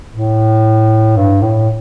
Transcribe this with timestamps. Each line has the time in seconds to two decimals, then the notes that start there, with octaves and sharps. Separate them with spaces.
0.13 A2
1.16 G2
1.42 A2